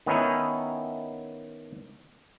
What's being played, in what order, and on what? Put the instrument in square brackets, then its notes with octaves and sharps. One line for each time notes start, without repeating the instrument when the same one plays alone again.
[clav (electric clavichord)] D#3 B3 C#4 D#4 E4